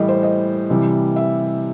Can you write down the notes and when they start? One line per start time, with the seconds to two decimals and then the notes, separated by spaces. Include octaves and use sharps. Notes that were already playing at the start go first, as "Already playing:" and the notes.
Already playing: A2 E3 G3 D#5
0.08 C5
0.23 D#5
0.70 C3 E3 G3
1.16 E5